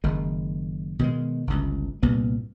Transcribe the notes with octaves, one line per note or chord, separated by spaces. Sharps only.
F#1 D#3 G#3
B2 D#3 G3 G#3
G1 C#2
C2 G2 A#2 B3